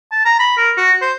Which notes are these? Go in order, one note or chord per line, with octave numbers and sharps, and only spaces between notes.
A5
A#5
B5
A#4
F#4
C5